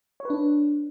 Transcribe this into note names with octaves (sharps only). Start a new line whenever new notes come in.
C#5
B4
D4